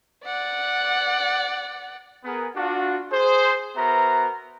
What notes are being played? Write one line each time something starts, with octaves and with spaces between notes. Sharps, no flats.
D5 F#5
B3 G#4 A#4
D4 F4 F#4
G#4 C5
B3 F#4 A#4 C5 E5 A#5